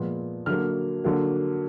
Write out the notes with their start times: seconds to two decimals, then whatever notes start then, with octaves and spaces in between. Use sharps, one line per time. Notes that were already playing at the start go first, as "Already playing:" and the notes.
Already playing: A#2 F3 G#3 B3
0.46 D3 F#3 A#3 F6
1.04 D3 F#3 A#3